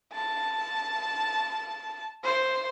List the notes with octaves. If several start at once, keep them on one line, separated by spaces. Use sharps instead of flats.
A5
C5